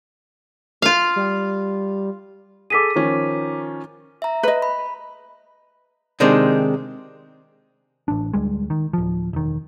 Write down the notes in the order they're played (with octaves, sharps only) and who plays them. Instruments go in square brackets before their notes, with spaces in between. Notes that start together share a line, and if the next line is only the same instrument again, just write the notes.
[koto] F4 F5
[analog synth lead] G3
[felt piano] G#4 A4 [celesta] D6 B6 D#7
[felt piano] D#3 F3 C#4
[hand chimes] E5 A#5
[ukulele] B4 D#5
[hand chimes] B5
[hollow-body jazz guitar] C3 D#3 G#3 C4 D4
[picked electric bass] A1 D4
D2 G3 G#3
D#3
D1 F3
E1 D#3